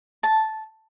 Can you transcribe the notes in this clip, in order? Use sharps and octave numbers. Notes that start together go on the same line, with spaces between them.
A5